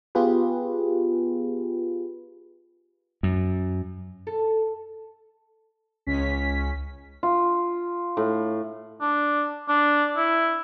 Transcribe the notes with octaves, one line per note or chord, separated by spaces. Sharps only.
B3 F4 G4 G#4 B4
F#2
A4
C#2 C#4 B6
F4
A2
D4
D4
E4